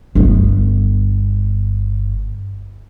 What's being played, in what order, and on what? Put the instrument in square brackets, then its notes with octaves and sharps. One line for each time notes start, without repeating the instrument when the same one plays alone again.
[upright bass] G1 B3